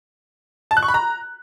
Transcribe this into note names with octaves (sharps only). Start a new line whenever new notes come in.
A5
F#6
C#6
B5
A#5